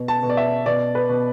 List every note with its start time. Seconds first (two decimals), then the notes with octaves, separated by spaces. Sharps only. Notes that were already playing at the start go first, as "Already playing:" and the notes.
Already playing: B2
0.08 A5
0.23 B2
0.30 D5
0.37 E5
0.66 B2 D5
0.95 B4
1.09 B2